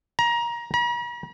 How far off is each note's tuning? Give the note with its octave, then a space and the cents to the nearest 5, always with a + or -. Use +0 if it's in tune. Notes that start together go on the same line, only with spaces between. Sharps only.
A#5 +20
A#5 +45